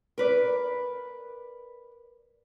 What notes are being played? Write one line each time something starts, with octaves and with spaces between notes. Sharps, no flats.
A#4 B4 D5